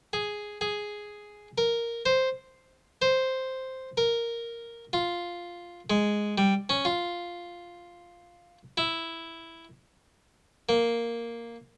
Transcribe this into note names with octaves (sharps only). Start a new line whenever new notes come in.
G#4
G#4
A#4
C5
C5
A#4
F4
G#3
G3
C#4
F4
E4
A#3